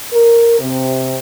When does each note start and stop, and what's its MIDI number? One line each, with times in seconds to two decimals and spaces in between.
0.13 0.57 70
0.60 1.17 48